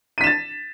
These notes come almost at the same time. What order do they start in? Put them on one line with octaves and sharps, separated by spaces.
D#7 B6 E7 A6